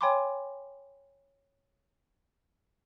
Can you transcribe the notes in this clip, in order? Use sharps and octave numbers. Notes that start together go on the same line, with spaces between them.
C#5 G5 G#5 B5 C6 D6